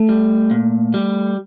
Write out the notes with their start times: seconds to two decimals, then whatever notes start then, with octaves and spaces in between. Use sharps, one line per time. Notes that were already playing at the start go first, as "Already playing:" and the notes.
Already playing: A3
0.09 G3
0.51 A#2
0.94 G3